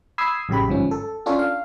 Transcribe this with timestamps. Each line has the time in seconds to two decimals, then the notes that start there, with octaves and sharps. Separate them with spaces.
0.18 B5 D#6 E6 G#6 C7
0.49 A1 F#2 C#3 G4 B5
0.68 G1 G#2 F3 C#4
0.91 A4
1.26 C#4 D4 F4 A4 C#5
1.39 F5